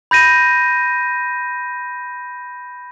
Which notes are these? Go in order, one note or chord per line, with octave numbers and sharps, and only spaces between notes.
B5 G6 A#6 D#7